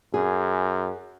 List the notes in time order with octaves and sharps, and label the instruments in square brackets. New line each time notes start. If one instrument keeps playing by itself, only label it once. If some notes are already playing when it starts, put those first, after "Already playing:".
[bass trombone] F#2 [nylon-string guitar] G#4